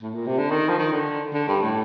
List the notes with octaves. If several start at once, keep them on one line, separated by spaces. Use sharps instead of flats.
A2
A#2
C3
D3
D#3
F3
D#3
D3
D3
G2
A2